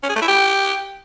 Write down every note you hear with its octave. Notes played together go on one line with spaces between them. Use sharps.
C#4
G#4
A3
E4
G4